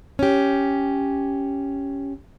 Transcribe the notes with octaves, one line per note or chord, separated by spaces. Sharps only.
C#4 G4